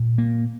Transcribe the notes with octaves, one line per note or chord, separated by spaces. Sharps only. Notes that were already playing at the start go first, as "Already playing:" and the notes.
Already playing: A#2
A#3